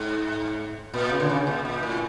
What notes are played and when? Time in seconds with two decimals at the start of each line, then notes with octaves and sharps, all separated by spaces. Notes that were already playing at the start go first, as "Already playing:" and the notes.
Already playing: G#2
0.94 A#2
1.12 C#3
1.20 D3
1.29 C#3
1.47 A#2
1.65 A#2
1.83 A2